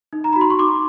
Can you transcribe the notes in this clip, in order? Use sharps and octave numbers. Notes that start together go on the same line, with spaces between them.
D#4
A#5
F#4 B5
C6
C#6
D#4 C6 D6